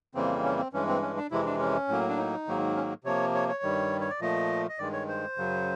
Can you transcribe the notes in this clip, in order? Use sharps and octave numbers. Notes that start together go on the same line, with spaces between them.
F2 C#3 E3 G3 A#3 C4
C#4
C4
G2 E3 G#3 C#4
C4
C#4
D4
F2 C3 E3 G#3 E4
D4
C#4
A2 F#3 A#3
D4
D#4
G#2 D#3 F#3 A#3
C#4
C3 F3 A#3 C#5
C#5
C#5
G2 D#3 G3
C#5
D5
A#2 F3 A3 D#5
D#5
G2 D#3 G#3 D5
C#5
C5
F#2 C#3 F#3